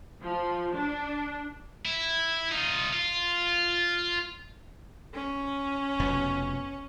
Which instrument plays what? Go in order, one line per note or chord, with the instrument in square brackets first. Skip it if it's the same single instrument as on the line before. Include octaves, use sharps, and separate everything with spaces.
[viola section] F3
D4
[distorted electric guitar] E4
D#4 F4
F4
[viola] C#4
[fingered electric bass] F1 B2 B3